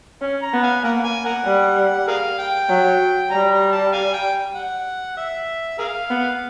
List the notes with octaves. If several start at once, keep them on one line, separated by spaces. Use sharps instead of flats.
C#4
A#5
B3
F5 G#5
A#3 A#4 F#5
G#5
A#4 F#5
G3
G#4 A#4 F5
G5
F#3
G3 A#5
A#5
A5
F5 G#5
G5
F#5
E5
G#4 A#4 F5
B3